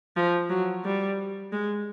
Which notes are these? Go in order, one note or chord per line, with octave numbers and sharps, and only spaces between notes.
F3
F#3
G3
G#3